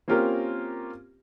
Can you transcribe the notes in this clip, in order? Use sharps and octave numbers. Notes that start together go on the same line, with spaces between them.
A#3 C4 C#4 F4 G4 A#4